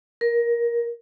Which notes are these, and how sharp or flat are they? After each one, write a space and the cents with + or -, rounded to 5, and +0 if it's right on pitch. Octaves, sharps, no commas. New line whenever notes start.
A#4 +15